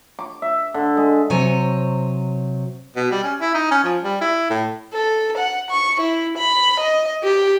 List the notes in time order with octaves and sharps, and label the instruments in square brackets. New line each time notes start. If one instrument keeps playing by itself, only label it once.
[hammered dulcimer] D6
E5
D3
G#3
[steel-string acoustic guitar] C3 F#3 C5 C#5 G#5
[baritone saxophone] B2
G3
C#4
E4
D#4
C#4
F3
G3
E4
A2
[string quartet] A4
F#5
C#6
E4
B5
D#5
G4